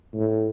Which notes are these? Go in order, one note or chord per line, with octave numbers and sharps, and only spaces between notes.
A2